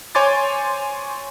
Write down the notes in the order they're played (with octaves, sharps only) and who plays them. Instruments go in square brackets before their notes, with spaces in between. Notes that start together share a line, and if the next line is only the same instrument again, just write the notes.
[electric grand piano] C5 C#5 G#5 C6 D6 A6